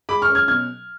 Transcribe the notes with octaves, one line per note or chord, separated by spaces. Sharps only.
G#3 B5 D6
C#6 F6
C#4
F6 G#6
B2 F6 G#6